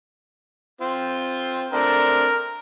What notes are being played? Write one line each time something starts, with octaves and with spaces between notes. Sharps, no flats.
C4 F4 G5
A3 C4 D4 A#4